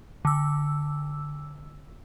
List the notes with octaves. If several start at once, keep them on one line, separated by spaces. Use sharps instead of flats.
D3 E6